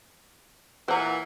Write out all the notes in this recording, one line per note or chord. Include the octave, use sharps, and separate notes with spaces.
A#2 E3 C5 F#5 A#5